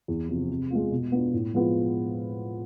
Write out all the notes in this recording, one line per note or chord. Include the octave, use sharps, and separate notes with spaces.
E2
C3 F3
C3
G#3 B3 F4
B2
B3 D4 F4
A2
F3 G#3 B3 F4